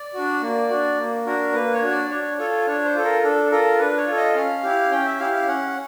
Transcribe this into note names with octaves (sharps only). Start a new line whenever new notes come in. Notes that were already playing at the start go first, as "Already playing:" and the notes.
Already playing: D5
D4 F#4
A#3
D4 F#4
A#3
D4 F#4 A#4
A#3 B4
C#5
D4 F#4
D5
D4 C#5
F4 A4 C#5
D4 C#5
C5
F4 A4
A#4
D4 A4
F4 A4 A#4
D4 B4
C#5
F4 A4
D#5
C#4 F5
E4 G4
C#4 G5
E5
E4 G4 F5
F5
C#4 F#5